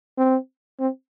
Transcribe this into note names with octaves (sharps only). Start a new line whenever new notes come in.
C4
C4